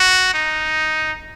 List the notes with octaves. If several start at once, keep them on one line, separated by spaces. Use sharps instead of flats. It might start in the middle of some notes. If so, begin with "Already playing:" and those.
Already playing: F#4
D#4